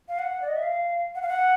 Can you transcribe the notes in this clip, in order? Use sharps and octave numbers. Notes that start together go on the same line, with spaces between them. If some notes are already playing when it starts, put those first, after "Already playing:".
F5
F#5
D5
D#5
E5
F5
F#5
F5
F#5